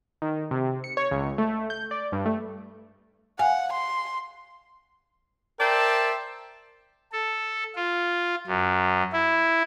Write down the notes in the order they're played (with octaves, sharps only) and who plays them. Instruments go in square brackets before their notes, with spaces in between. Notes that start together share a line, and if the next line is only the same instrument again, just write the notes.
[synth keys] D#3
C3
C#7
C#5
C#2
A3
G6
D5
G2
A3
[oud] F5 [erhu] F#5 [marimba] G#5
[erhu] C6
[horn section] A#4 C5 D5 E5 G5 A5
[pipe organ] A4
F4
F#2
E4